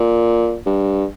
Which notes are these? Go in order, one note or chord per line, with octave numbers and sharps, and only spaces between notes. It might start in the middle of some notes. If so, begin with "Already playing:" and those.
Already playing: A#2
G2